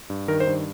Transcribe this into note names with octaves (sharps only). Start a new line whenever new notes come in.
G2
D#3 A#4
C5
G2